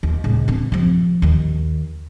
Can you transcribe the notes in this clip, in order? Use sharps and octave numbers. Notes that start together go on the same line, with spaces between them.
D#2
C#2 A#2
C4 D4
C3 F3
D#2 D#3